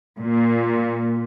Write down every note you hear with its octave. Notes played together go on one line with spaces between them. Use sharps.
A#2